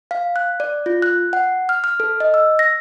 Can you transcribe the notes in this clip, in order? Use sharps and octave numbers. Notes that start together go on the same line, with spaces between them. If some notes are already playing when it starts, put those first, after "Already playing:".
F5
F#6
D5
F4
F#6
F#5
F6
F6
A4
D#5
E6
A#6